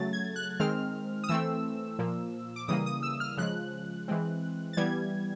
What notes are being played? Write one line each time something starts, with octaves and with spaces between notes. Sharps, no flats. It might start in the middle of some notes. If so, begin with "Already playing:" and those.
Already playing: C#3 F#3 A3 A6
G#6
F#6
D#3 G#3 C4 F6
D#6
E3 A3 C4 E6
A#2 F3 A#3
D6
C#3 E3 G3 A#3 D#6
D#6
E6
F6
C#3 F3 G#3 F#6
E3 G#3 C4
A6
E3 G3 B3 G#6